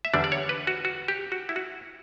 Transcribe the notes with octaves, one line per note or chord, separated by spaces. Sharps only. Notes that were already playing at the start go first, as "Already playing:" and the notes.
E5
E2 D3 G3 D4 D5
D5
C#5
B4
F#4
F#4
G4
F#4
E4
F#4